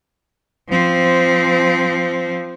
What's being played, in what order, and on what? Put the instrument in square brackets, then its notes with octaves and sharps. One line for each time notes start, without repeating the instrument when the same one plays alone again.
[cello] F3 C4